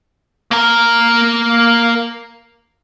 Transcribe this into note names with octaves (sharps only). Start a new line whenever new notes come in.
A#3 A#4